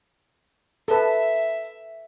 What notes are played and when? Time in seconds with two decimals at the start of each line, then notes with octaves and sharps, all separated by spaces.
0.88 A4 B4 E5